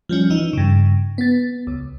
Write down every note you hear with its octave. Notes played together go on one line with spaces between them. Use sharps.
F3 G3 C#4
E3 D#4
G2 C#3
B3 A6
C#2